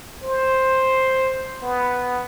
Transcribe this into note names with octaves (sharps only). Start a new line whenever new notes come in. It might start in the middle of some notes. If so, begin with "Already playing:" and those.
C5
B3